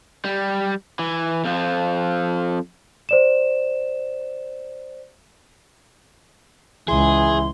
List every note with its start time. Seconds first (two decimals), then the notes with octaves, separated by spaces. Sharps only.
0.25 G3
0.99 E3
1.45 F2 F3
3.09 C5 D5 E7
6.88 C#2 E3 G#4 C6